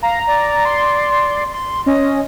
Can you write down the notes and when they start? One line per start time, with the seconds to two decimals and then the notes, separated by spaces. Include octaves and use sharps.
0.03 F5 A#5
0.27 D5
0.65 C6
1.53 C6
1.86 C#4 D#5